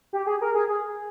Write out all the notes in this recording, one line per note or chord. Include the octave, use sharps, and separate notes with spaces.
G4
G#4
A#4
G#4
G#4